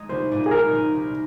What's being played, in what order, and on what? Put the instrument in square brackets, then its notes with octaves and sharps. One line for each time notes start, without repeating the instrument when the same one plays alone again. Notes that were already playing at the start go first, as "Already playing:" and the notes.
Already playing: [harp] G#3 D#4
[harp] C2 [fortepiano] C5
[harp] A#2 G#3 D#4
[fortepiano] G#4
[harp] C2 [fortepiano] A#4
[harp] A#2 G#3 D#4
C2